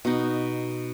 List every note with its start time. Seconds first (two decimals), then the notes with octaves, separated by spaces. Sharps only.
0.05 B2 D#4